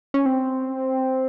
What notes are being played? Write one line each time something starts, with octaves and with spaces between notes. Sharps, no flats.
C#4
C4